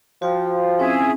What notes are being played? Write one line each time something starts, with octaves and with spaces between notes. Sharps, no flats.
F3 F#4 C5 G5
C4 C#4 E4 G#4 E5